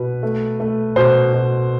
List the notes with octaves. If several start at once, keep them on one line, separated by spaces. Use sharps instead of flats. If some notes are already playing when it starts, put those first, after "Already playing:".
Already playing: B2 B4
A3
A3
B2 C5
B2